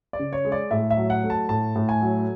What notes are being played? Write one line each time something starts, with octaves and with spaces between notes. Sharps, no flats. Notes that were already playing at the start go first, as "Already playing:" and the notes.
D5
C#3
C#5
G#3
D5
A2 E5
E5
F#3
F#5
A3
A5
A2 A5
A2
G#5
F#3